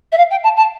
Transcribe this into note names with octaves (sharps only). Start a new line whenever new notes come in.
E5
F5
G5
A5
A5